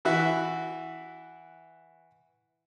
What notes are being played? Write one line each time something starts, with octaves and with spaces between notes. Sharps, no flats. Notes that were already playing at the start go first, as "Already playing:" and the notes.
E3 E4 F#4 E5